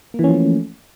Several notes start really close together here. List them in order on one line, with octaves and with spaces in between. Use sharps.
A#3 E3 C#4 F3 A3